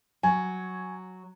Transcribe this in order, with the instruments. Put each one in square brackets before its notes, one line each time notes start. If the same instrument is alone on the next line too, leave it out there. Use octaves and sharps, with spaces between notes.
[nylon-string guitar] F#3 [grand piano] G#5